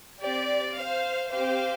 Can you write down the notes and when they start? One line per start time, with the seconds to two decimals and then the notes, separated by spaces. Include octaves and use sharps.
0.23 C4 G4 D5
0.79 C5 F5
1.33 C4 G4 C5 F5